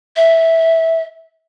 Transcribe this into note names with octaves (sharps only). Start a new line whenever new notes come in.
E5